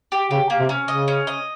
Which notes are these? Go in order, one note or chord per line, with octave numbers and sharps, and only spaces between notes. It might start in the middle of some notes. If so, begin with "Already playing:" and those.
G4
C#3 G4
A#3
C3
C#4
C#3 D#5
C#4
D#5